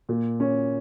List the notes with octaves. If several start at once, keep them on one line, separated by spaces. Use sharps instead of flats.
A#2
C#4